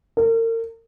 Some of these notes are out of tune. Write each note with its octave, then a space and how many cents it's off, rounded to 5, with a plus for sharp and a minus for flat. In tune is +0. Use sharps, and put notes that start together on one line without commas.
A#4 -40